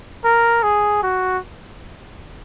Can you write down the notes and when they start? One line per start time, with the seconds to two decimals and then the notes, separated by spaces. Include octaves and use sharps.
0.25 A#4
0.63 G#4
1.03 F#4